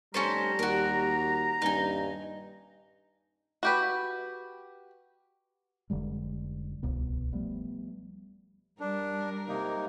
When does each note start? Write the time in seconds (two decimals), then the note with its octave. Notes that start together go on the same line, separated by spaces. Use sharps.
0.14 F1 G3 C#4 A4 C5 A#5
0.59 D#2 F#4 A#4
1.62 D#1 G2 D#4 G#5
3.63 F#4 G4 B4
5.90 F1 D3 G3 G#3
6.83 D1 C2 B2 B3
7.33 F3 G3 A3 B3
8.80 G3 D4 A#4
9.48 C3 A#3 D#4